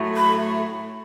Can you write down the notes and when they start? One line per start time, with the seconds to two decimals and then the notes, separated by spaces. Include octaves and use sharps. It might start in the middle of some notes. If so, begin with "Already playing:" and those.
Already playing: A2 F#3 A3
0.17 B5